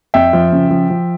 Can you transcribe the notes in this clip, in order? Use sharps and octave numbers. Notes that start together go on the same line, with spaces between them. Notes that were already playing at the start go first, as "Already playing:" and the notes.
F2 E5 G5
F3
C#3
F3
F3